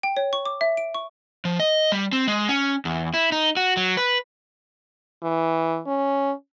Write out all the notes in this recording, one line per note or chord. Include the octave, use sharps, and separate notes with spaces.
G5
C#5
C#6
D6
E5
D7
C#6
F3
D#5
G3
C4
G#3
C#4
E2
E4
D#4
F#4
F#3
B4
E3
C#4